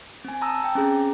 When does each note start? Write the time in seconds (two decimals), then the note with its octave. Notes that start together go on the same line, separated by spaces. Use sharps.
0.25 C4 G#5
0.42 A5 A#5 D#6 E6
0.60 G5 A#5
0.75 C4 C#4 G#4 A#5